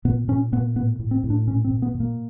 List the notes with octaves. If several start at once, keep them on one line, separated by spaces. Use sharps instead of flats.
A#2 B3
A#2 C#4
A#2 B3
A2 B3
A2
C4
A2
D4
A#2 C#4
C4
A#2
B3
A#2
A#3